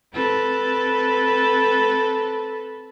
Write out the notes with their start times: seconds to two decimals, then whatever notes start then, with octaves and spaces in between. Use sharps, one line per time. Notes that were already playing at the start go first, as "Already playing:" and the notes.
0.12 C4 A4 B4